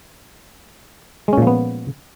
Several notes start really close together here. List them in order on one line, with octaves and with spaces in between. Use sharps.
G#3 C#4 A#2 F3 B3